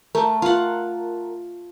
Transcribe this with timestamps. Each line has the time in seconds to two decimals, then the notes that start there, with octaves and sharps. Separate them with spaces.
0.15 A3 A#4
0.42 F4 F#5